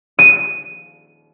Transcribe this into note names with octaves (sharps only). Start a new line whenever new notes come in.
D#7